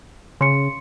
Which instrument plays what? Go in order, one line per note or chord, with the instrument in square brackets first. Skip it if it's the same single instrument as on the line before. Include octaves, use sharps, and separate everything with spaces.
[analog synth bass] C#3 [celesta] C6 C#7